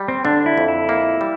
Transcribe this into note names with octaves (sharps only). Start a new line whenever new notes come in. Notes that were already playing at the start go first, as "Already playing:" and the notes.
Already playing: G3
C4
D3 D4
E4
F2
E4
A#3
G3